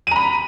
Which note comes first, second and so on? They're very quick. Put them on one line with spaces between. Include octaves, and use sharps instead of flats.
D#7 A#5 B5